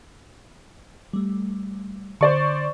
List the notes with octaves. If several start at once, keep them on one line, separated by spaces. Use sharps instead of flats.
G3 A3
D3 C5 D5 C#6